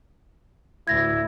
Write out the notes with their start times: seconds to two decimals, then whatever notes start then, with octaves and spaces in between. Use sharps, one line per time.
0.88 D2 A2 E4 G#6 A#6